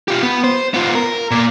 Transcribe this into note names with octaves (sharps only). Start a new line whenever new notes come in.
F4 G4
B3
C5
B3 F4
A#4
A#2 A#3